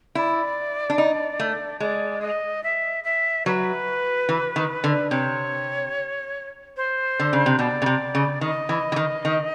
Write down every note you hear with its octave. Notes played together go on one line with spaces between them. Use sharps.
E4 D5
D4
D#4
A3
G#3 D5
D#5
E5
E5
F#3 B4
E3
D#3
D3
C3 C#5
C5
D3
C#3
C3
B2 D5
C#3
C3
C#3
D#3 D#5
E3
E3
D#3
D#3